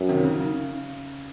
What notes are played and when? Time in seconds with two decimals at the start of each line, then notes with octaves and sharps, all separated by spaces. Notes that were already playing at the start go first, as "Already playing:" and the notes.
Already playing: F#2
0.09 C3 D#3
0.24 C#3
0.39 C#3